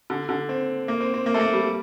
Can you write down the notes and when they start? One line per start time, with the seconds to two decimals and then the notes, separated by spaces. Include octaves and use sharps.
0.10 D3
0.29 D3
0.49 C4
0.88 A#3
1.00 C4
1.14 C4
1.26 A#3
1.34 A3
1.40 A#3
1.53 G3